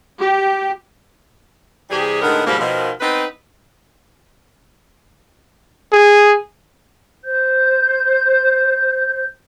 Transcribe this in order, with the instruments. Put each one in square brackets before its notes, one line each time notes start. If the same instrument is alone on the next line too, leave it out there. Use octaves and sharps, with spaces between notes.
[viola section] G4
[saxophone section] C3 E3 G3 G4 G#4
A2 D3 D#3 G#3 B3 A#4
G#2 B2 F3 G3 A#3
B2 D#3 F3
B3 C4 D#4 B4
[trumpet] G#4
[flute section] C5 G6